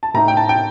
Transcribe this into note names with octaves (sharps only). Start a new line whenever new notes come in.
A5
A2 A3 D#4 A#5
G5
A5
G5